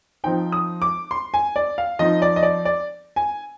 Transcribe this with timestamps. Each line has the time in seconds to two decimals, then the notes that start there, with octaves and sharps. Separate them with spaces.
0.24 F3 C4 D#4 G5
0.52 D#6
0.82 D6
1.11 C6
1.34 G#5
1.56 D5
1.78 F5
1.99 F3 C4 D#4 D#5
2.22 D5
2.36 D#5
2.43 D5
2.65 D5
3.16 G#5